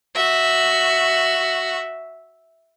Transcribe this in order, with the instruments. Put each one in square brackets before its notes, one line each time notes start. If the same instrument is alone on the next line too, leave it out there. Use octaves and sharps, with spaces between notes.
[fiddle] F#4 E5